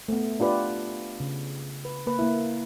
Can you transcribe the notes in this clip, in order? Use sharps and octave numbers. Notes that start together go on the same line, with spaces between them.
A3 B3
D4 F4 G4 B4 D5
C#3
B4
A#3 B4
A#3 E4